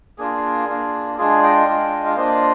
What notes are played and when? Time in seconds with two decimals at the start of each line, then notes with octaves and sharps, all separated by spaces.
0.18 A#3 D4 F4 G#4
0.68 A#3 D4 F4
1.18 G#3 D4 F4 G#4
1.43 D#5 G5
1.67 G#3 D4 F4
2.06 F5
2.16 A#3 D4 F4 C5 D#5